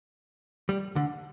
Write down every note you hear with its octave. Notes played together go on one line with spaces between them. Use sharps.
G3
D3